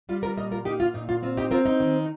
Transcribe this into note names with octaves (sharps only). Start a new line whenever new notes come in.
G3 F4
F4 A#4
A#2 A#4 D#5
F4 A#4
A#3 D#4 G4
F4
A#2 D#4
F4
C4 F4
D#4 G4
C4 F4 A#4
D#4
D#3